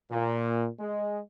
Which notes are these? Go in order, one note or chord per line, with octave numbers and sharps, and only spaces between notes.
A#2
G#3